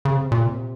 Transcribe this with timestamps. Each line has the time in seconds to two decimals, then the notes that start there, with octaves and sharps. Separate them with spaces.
0.05 C#3
0.16 C3
0.32 A#2
0.46 C3